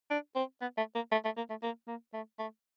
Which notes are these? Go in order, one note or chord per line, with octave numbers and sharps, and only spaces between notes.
D4
C4
B3
A3
A#3
A3
A3
A#3
A3
A#3
A#3
A3
A3